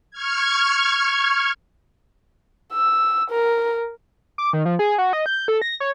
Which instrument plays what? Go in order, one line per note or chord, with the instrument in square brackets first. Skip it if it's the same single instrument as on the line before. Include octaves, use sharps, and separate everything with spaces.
[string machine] C#6 F6 G#6
[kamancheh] E6
A#4
[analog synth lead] D6
D#3
F3
G#4
F#4
D#5
G6
A4
A#6
C#5